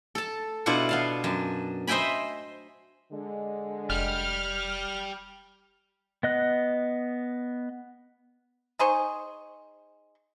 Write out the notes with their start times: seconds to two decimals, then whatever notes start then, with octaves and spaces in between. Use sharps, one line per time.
0.15 A4 A5
0.66 B2 D4 E4 F4 F#5
0.89 B3 F5 A5
1.24 F#2 A5
1.87 C5 D#5 E5 G5 G#5 B5
3.13 D3 G#3
3.90 F1 G3 F6
6.23 B3 D#5 F#6
8.79 D#4 G#4 C5 C#6